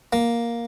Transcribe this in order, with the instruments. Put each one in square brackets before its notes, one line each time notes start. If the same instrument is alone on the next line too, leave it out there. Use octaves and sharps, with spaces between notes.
[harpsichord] A#3